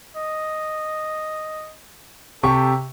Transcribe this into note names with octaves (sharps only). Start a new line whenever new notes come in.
D#5
C3 G4 A4 C#6